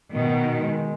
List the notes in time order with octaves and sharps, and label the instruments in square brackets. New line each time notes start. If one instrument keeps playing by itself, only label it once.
[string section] B2 D#3 [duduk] B3
[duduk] G#3